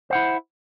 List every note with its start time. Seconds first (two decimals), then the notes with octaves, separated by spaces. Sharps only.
0.10 C5
0.13 F#5
0.15 E4